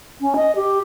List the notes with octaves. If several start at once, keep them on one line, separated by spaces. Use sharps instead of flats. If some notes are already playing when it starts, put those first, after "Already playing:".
C#4
D#5
G4